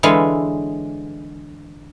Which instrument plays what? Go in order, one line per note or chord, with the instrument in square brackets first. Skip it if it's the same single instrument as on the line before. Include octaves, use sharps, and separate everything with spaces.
[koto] D3 E3 G#3 B4 C#5 F5